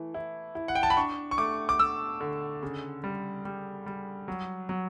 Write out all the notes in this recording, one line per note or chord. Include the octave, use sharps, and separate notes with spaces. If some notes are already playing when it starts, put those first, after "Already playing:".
Already playing: E3 A3
E4
E4
F#5
G5
A5
B5
D4 C#6
C#6
A3 D6
D6
A3 E6
D3
C#3
G3
G3
G3
F#3
F#3